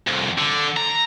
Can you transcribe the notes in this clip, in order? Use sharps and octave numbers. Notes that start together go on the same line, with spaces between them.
C2 F2
D3
A#5